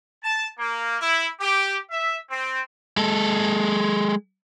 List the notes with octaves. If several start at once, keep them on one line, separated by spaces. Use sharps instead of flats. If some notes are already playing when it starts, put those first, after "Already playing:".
A5
A#3
E4
G4
E5
C4
G#3 A4